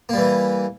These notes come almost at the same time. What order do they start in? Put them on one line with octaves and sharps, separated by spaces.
A#3 G3 E3